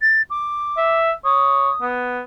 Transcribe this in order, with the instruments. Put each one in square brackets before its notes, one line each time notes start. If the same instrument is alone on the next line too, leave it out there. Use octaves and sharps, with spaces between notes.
[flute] A6
D6
[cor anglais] E5
[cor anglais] C#5 [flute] D#6
[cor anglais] B3